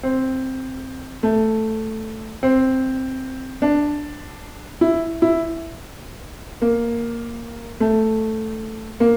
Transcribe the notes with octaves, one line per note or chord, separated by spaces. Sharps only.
C4
A3
C4
D4
E4
E4
A#3
A3
A#3